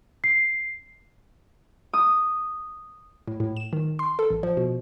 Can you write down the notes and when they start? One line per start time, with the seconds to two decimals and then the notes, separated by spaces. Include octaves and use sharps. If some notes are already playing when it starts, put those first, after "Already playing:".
0.24 C7
1.93 D#6
3.28 A2
3.40 A2
3.57 E7
3.73 D#3
3.99 C6
4.19 A4
4.30 A1
4.43 F3
4.57 B2